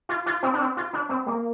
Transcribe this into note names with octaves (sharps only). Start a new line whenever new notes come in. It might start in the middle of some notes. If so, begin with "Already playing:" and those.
F4
F4
C4
D4
C4
F4
D4
C4
A#3